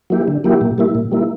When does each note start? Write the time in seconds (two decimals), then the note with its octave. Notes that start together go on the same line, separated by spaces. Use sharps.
0.10 F#3 A#3 E4 G4
0.28 D3
0.44 F#3 A#3 E4 G4
0.61 A#2
0.78 G3 A#3 E4
0.95 A#2
1.11 G3 A#3 E4